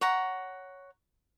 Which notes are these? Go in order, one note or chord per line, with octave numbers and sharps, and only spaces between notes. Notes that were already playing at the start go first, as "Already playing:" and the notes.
C#5 F#5 A#5